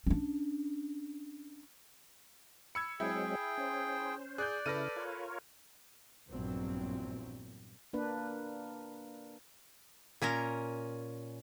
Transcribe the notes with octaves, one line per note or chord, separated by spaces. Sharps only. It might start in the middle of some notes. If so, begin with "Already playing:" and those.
C#4 D4
B5 E6 G#6 C#7
F#3 G#3 C4 E4 G#4 G5
C#4 C5
G#4 D5 F#6 G6
C#3 E4 A4 B4 F6 A#6 D#7
F4 A#4 C#5
A#1 E2 G2 A#2 F#3 C4
A#3 D4 B4
A#2 C#4 A#4 A#5